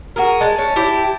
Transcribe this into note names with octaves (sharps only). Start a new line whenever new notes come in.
F#4 G#4 A#4
G#3 A5
C#4
E4 G4